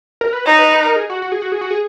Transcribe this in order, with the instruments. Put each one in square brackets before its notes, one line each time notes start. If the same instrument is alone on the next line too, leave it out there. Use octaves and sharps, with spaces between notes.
[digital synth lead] A#4
B4
[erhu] D#4 [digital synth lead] C#5
[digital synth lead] B4
B4
A#4
G#4
F#4
F#4
G#4
F#4
G#4
F#4
G#4